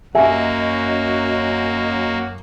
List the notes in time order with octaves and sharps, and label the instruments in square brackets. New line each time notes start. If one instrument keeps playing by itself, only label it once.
[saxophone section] F#2 [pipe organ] A#3 F#4 [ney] D#5 [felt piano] E5 G#5